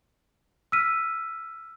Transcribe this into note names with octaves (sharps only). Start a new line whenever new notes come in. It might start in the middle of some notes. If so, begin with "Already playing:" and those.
E6 F6 B6 D#7